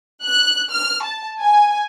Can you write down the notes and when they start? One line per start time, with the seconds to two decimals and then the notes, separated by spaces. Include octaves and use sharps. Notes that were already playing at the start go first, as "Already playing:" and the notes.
0.23 F#6
0.70 F6
1.03 A5
1.39 G#5